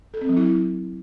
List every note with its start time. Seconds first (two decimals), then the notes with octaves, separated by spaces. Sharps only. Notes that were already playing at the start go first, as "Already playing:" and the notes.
0.14 A4
0.21 C4
0.29 F#3
0.37 E4